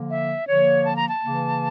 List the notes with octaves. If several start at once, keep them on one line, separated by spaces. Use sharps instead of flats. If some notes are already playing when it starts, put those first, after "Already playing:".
Already playing: D3 F3 A#3
E5
D3 F3 A#3 C#5
A5
A#5
A5
C#3 E3 A#3